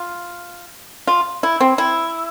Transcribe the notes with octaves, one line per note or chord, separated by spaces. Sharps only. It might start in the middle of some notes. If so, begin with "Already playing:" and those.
Already playing: F4
F4
E4
C4
E4